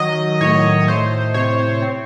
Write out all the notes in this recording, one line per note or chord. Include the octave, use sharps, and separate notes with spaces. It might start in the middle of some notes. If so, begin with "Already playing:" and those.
Already playing: D#3 F#3 D#5
A2 C#5
A3 C5
C3 C#5
C4